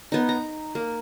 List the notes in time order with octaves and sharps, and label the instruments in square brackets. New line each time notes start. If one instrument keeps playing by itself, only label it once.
[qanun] B3 D#4
A#5
A#3